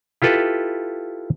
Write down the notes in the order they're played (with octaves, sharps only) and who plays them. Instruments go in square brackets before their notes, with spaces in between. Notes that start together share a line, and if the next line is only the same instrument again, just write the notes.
[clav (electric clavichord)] E4 F4 G4 A4 B4